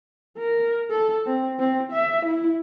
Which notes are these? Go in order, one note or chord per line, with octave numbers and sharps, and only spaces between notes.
A#4
A4
C4
C4
E5
E4